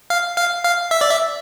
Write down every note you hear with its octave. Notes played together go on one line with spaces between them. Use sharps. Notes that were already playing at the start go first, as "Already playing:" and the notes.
F5
F5
F5
E5
D5
E5